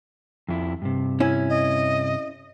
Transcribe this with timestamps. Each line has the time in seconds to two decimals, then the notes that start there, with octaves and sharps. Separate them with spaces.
0.48 F2 E4
0.82 G2 C3
1.20 C#4 E4
1.49 D#5